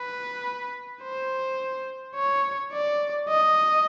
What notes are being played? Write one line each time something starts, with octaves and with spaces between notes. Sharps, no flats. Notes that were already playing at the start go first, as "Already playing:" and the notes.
Already playing: B4
C5
C#5
D5
D#5